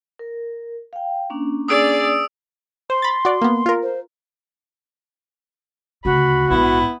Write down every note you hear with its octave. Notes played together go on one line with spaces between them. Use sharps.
A#4
F5 G5
A#3 C#4 D4
G#4 D5 D#6 E6 D7
C5 C6
B5 A6
F#4 D5
A#3 B3
F4 A#4
C5
D2 C#3 F#4 B5
A#1 G#2 B3 E4